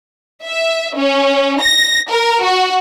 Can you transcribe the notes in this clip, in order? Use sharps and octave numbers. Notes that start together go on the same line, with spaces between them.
E5
C#4
A#6
A#4
F#4